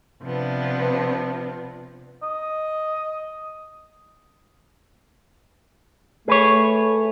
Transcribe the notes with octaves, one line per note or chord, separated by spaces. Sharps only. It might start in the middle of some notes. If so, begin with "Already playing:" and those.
C3 F3 B3 D4
D#5
A3 G#4 B4 C#5